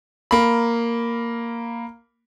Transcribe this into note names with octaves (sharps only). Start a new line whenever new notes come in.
A#3 B5